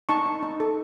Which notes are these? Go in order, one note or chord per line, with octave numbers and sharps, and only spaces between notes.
D#4 A5 C#6
D#4
D#4
A4